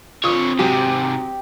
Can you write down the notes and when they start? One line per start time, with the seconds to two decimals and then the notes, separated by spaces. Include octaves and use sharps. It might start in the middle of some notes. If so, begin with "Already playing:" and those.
0.24 D3 C4 F4 C#5 D#6
0.59 G#2 C3 F#3 G4